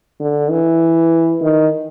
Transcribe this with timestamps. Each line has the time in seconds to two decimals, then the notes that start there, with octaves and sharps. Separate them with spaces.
0.21 D3
0.51 E3
1.42 D#3